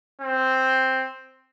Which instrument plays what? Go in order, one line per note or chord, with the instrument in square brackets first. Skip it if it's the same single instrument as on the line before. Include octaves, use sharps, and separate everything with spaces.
[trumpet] C4